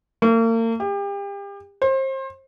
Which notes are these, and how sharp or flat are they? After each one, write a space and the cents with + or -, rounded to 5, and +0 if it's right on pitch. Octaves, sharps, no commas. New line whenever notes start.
A#3 -40
G4 +35
C5 +30